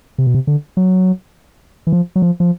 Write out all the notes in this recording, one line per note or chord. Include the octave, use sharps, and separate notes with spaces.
C3
B2
C3
D3
F#3
E3
F3
F#3
F3
F3